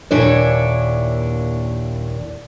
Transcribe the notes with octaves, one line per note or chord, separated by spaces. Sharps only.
D#2 A#2 D4 E4 C#5 D5